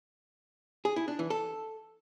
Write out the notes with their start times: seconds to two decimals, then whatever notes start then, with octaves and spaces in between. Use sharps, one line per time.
0.85 G#4
0.96 E4
1.08 D4
1.19 E3
1.30 A4